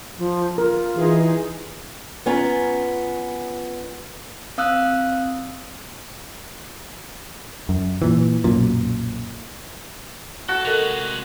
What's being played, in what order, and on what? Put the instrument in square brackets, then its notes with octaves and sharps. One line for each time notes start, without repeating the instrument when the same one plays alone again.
[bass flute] F3
[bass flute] F4 [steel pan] A#4
[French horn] E3 [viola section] D#4 G#4
[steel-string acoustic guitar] B3 C#4 F4 A#5
[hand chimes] C4 F5 D#6 E6 F#6
[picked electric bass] F#2
A#2 E3
B1 F#2 A#2
[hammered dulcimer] F#4 [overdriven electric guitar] A4
[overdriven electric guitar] C3 G#3 [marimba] A4 A#4 D#5